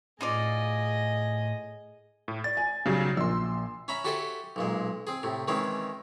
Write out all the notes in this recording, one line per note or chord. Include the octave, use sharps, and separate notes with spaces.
A2 D#4 F4 G#4 D5 D#5
A2
D5 A6
G#5
B1 C#3 F#3 G3
A#1 A#2 C6 E6
C#4 E5 A#5 B5
F#4 G4 A4 C5 E5 G#5
B1 A#2 G#3
C4 G#4
A2 C3
D#3 E3 G#3 C4 C#4